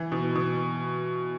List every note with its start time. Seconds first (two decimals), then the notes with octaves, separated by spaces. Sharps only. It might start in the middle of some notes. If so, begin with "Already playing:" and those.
Already playing: E3
0.12 B2
0.35 B2